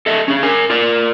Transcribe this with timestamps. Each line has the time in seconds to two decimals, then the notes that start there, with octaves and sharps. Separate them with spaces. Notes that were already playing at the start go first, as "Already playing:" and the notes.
0.06 A4 D#5 E5
0.28 C#4 G#4
0.43 A#4 G#5
0.70 F4 A#4 D5